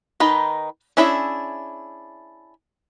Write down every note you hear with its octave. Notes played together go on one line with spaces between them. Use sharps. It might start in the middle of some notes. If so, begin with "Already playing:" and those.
D#3 D#4 B4 B5
C#4 D4 E4 G#4 E5